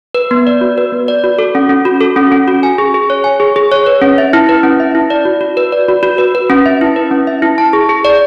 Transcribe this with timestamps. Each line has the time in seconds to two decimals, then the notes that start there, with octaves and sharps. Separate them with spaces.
0.15 B4
0.31 B3
0.47 D5
0.61 F#4
0.78 B4
0.92 B3
1.08 D5
1.24 F#4
1.39 A4
1.55 C#4
1.69 C#4
1.85 F#4
2.01 A4
2.16 C#4
2.32 C#4
2.48 F#4
2.63 G#5
2.78 G#4
2.94 G#4
3.10 C#5
3.24 G#5
3.40 G#4
3.56 G#4
3.71 C#5
3.86 B4
4.02 C#4
4.18 E5
4.33 E4
4.49 B4
4.63 C#4
4.80 E5
4.95 E4
5.10 D5
5.25 F#4
5.41 F#4
5.57 B4
5.72 D5
5.88 F#4
6.03 F#4
6.18 B4
6.35 B4
6.50 C#4
6.66 E5
6.81 E4
6.96 B4
7.11 C#4
7.27 E5
7.42 E4
7.58 A5
7.73 G#4
7.89 G#4
8.05 D5